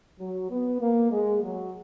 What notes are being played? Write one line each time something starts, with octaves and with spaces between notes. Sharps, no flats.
F#3
B3
A#3
G#3
F#3